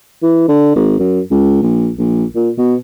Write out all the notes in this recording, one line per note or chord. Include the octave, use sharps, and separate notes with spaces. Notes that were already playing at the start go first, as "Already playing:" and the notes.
E3
D3
G#1
F#2
C#2
A#1
A#1
A#2
B2